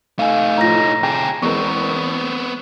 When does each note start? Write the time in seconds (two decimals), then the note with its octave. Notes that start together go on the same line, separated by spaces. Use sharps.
0.19 A3 D#4 F5 G#5
0.58 A2 F3 A#5 A#6
1.03 C3 G#4 G5 A5
1.42 E2 G#3 B3 C4 A#4 C#6